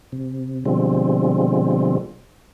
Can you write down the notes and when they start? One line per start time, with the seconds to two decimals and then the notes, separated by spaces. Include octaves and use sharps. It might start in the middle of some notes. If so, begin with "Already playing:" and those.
0.12 C3
0.66 B2 D3 F3 G3 G#3 C4